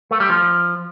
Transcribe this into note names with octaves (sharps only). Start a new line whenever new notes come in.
A3
G3
F3